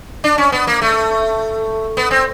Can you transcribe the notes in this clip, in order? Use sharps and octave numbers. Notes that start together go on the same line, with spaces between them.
D4
C#4
B3
A#3
A3
B3
C4